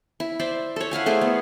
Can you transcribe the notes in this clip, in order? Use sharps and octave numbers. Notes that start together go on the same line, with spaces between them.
E4
C5 D5 E5
A4 C#5
E4 F5 F#5 G#5
A3 G#4 C5 D5
B3